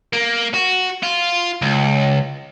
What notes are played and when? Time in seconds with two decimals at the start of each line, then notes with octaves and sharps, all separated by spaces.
0.13 A#3
0.54 F#4
1.03 F4
1.62 C#2